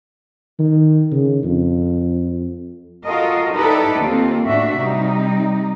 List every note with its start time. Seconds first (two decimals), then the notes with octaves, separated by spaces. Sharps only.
0.59 D#3
1.12 C#3
1.43 F2
3.05 F4 F#4 A4 A#4 D#5
3.53 D#4 E4 G4 A4 B4 D5
4.00 D#2 A#3 C4 F4
4.46 A2 D4 F#4 E5
4.77 C3 G3 D#4